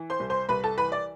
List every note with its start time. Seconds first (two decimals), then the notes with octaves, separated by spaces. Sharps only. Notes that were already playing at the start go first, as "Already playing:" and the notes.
Already playing: E3
0.10 C5 C6
0.20 C2
0.30 C5 C6
0.49 C2 B4 B5
0.64 A4 A5
0.78 E3 B4 B5
0.92 D5